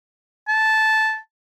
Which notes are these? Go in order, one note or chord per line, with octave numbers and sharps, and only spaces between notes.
A5